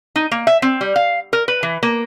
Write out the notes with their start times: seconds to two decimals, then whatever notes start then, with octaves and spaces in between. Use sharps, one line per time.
0.16 D#4
0.31 A#3
0.47 E5
0.62 C4
0.81 G3
0.96 F5
1.33 A#4
1.48 B4
1.63 E3
1.83 A#3